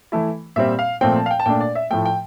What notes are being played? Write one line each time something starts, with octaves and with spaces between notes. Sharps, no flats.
E3 A3 E4
A#2 G3 C4 E5
F5
A#2 F3 A3 C4 G5
A5
F5
G5
A5
A#2 A3 D4 G5
D5
E5
A2 F3 A3 G5
G5